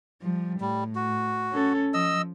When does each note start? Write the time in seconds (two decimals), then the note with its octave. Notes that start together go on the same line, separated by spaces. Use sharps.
0.22 F3 G3
0.61 A2 G3
0.95 F#4
1.52 C#4 A4
1.94 F3 D#5 E6